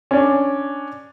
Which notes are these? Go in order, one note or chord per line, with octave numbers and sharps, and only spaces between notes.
C#4 D4